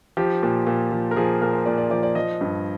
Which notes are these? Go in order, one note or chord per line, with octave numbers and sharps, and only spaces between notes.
F3 G4
A#2
A#2
F3
A#4
F3 G#4
A#2 A#4
C5
A#2 D5
D5
F3 D5
D5
F3 D#5
G2